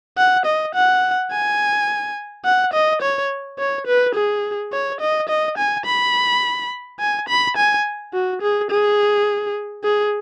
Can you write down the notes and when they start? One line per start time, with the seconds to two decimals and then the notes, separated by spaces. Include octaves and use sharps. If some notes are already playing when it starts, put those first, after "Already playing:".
0.17 F#5
0.46 D#5
0.75 F#5
1.31 G#5
2.45 F#5
2.73 D#5
3.02 C#5
3.59 C#5
3.87 B4
4.15 G#4
4.72 C#5
5.01 D#5
5.29 D#5
5.58 G#5
5.86 B5
6.99 G#5
7.28 B5
7.57 G#5
8.14 F#4
8.42 G#4
8.70 G#4
9.84 G#4